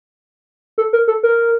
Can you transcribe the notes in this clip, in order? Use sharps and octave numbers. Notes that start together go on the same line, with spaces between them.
A4
A#4
A4
A#4